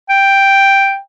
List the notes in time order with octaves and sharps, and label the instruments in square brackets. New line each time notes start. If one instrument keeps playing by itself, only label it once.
[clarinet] G5